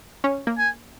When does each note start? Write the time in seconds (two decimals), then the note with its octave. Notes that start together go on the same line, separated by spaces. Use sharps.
0.24 C#4
0.47 A#3
0.59 G#5